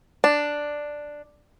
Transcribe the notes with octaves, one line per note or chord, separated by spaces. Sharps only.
D4